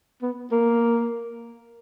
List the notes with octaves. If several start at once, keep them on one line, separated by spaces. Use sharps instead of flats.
B3
A#3